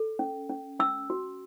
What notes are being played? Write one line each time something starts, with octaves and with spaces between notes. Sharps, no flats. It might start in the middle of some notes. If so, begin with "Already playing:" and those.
Already playing: A4
C#4
C#4
C#4 E6
F#4